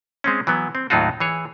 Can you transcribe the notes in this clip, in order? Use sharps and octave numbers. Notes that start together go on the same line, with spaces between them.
G#3 C4 C#4
E3 F#3 B3
C4
D#2 A2 F#3 D#4 F4 F#4
E3 G#4 C#5